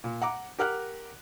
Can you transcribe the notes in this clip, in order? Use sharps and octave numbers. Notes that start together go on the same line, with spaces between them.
A#2
F#5 A#5 D6
G4 A#4 F#5 F6 F#6